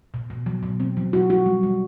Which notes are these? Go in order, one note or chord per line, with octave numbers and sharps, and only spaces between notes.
B2
B2
F#3
B2
C4
F#3
F#4
F#4
G3
G3